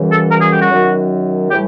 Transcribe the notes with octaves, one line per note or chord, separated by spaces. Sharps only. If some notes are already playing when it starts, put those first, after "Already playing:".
Already playing: F#2 C#3 E3 G3
A4
A#4
G#4
G4
F#4
F#2 D#3 F#3
A2 E3 G3 G4